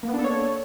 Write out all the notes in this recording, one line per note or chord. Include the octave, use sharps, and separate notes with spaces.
A#3
B3
D4
A4
C#5